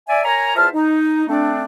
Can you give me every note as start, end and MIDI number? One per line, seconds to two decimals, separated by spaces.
0.09 0.22 74
0.09 0.22 76
0.09 0.22 80
0.25 0.55 70
0.25 0.55 73
0.25 0.55 80
0.25 0.55 82
0.56 0.69 40
0.56 0.69 65
0.56 0.69 72
0.56 0.69 76
0.56 0.69 81
0.56 0.69 89
0.74 1.27 63
1.28 1.64 57
1.28 1.64 60
1.28 1.64 62